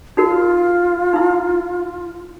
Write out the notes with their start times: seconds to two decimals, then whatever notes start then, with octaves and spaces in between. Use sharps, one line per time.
0.17 D#4 F4 F#4 A#4
1.13 D#4 E4